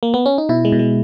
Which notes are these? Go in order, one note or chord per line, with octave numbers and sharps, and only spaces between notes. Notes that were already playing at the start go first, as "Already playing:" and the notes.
A#3
B3
C#4
D#4
B2 E4
G#3
B2
G#3